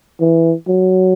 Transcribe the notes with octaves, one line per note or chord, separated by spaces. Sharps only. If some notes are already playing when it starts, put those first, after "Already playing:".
E3
F#3